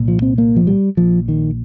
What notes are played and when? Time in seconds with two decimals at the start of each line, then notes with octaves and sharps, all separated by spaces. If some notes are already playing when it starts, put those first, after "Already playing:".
Already playing: C2 A#2
0.08 F3
0.22 C4
0.38 A#3
0.56 F3
0.67 G3
0.97 A#1 A#2 F3
1.28 D#3